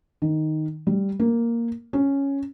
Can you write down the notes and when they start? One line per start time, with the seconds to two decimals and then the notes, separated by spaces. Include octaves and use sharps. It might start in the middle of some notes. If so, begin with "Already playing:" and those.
0.22 D#3
0.87 G3
1.20 A#3
1.93 C#4